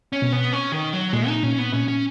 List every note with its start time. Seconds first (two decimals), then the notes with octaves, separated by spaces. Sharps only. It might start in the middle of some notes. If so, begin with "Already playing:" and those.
0.13 C#4
0.22 B2
0.32 B3
0.53 C#4
0.72 D#3
0.93 F#3
1.13 A#2 G#3
1.28 D#4
1.43 A#2 C#4
1.59 B3
1.73 A#2 C#4
1.88 C#4